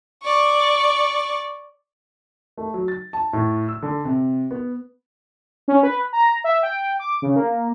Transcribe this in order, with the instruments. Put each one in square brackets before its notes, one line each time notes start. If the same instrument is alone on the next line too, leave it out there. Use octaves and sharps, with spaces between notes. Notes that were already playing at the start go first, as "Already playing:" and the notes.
[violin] D5 C#6
[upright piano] A3
F#3
A6
A5
A2
E6
D3
C3
B3
[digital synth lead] C#4
B4
A#5
E5
G5
D6
C#3
A#3